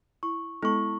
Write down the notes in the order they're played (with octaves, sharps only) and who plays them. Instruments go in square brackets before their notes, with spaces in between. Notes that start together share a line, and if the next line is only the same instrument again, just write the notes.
[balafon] E4 [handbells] C#6
[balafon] G#3 B3 A4 [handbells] E4 C#6